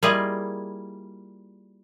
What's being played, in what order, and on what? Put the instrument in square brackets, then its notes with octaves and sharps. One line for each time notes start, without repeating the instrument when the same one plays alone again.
[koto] G3 A#3 E4 F4 G#4 D#5